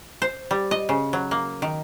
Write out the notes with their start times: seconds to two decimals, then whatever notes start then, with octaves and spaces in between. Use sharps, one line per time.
0.22 C5
0.51 G3
0.71 D#5
0.89 C#3
1.13 F#3
1.31 A#3
1.62 D#3